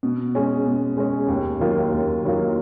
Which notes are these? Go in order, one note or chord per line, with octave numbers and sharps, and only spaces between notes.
B2
G#3 C#4
B2
G#3 C#4
D#2
D#3 F#3 A#3 F4
D#2
D#3 F#3 A#3 F4